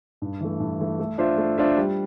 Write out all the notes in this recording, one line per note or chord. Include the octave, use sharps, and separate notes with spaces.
G2
E3 A3
G2
E3 A3
A3
D4 F4 C5 E5
A3
D4 F4 C5 E5
G3